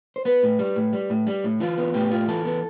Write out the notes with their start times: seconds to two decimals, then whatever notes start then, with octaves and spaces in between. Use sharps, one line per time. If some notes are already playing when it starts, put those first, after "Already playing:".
0.16 C5
0.25 B3 B4
0.43 A2
0.59 G3
0.76 A2
0.93 G3
1.10 A2
1.27 G3
1.44 A2
1.60 E3 F4
1.78 B3
1.94 A2 G4
2.11 F4
2.28 E3 A4
2.45 B3